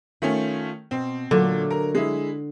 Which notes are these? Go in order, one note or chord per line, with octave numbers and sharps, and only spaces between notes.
D#3 A3 C#4 F4
B2 C4
A#2 D3 F#3 A3
A#4
G#3 E4